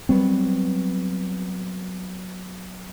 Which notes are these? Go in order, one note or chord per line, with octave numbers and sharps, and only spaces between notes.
F#3 G3 B3 C4